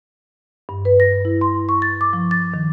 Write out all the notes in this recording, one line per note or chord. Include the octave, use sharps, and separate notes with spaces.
G2
B4
A#6
E4
C6
C#6
A6
D6
F3
A6
D#3